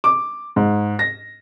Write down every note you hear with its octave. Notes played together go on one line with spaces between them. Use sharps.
D6
G#2
A#6